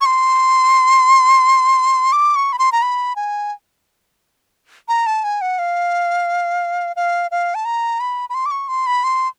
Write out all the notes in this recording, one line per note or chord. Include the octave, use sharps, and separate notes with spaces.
C#6
C6
D6
C#6
B5
C6
A#5
B5
G#5
A#5
A5
G#5
F#5
F5
F5
F5
A5
A#5
B5
B5
C6
D6
C#6
C6
B5
C6